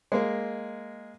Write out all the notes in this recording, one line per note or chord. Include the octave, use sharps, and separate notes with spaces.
G#3 A#3